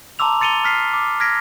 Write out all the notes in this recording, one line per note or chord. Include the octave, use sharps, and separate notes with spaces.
A5 A#5 C6 D6 E6 F7
C6 A6 C#7 D#7 F7 G7
F6 B6 C7
D6
F6 G#6 A#6 B6 D7